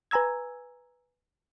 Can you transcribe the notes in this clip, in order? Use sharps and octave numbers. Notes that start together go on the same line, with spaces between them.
B4 G#5 A#5 E6 G#6